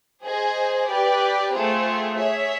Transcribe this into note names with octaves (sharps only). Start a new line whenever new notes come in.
G#4 C5 D#5 G#5
G4 B4 D5
A3 C4 F4 G#4
G#4 C#5 E5